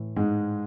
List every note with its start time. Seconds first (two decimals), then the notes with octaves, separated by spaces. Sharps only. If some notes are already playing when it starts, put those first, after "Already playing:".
Already playing: A2 E3
0.16 G#2 G#3